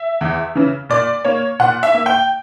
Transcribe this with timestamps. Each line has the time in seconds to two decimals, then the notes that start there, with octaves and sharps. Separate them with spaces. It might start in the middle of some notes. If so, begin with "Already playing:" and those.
Already playing: E5
0.21 E2
0.55 C#3 E3
0.89 A#2 D5
1.25 A#3 C#5
1.59 A#2 F#5
1.83 E5
1.94 A#3
2.06 G5